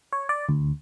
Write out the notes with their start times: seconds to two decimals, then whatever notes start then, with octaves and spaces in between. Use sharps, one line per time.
0.13 C#5
0.29 D5
0.49 D2